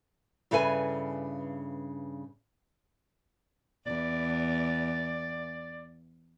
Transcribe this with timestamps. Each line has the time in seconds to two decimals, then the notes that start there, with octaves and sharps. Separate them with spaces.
0.51 G2 C#3 E4 A4 B4 G#5
3.87 E2 D5